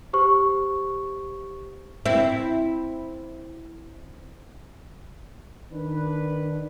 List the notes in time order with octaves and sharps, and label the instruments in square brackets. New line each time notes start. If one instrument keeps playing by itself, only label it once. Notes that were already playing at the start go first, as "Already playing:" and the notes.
[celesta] G4 C5 C#6
[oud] C4 E4
[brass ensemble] D#3 D4 B4